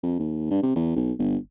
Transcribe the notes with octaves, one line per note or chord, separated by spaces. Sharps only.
F2
D#2
G2
C3
E2
B1
G1